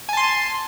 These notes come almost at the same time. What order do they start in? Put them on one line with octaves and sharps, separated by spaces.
G#5 A5 C6